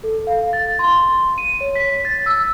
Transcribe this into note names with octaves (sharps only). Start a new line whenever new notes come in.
A4
F5
A6
C6
D#7
C#5
B6
A6
E6